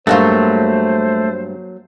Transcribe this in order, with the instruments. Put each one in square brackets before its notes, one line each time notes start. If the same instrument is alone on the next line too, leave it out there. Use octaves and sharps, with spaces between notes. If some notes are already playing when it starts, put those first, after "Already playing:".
[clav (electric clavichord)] G2 [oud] F#3 A#3 F4 [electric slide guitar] A3 [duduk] C5